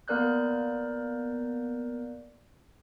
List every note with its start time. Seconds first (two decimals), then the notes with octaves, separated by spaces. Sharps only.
0.08 A#3 B3 A#4 D5 F#6 G6